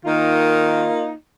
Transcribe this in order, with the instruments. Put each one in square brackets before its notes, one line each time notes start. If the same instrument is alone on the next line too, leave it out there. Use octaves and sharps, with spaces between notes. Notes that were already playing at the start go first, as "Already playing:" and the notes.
[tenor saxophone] D#3 [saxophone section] A#3 D#4 F4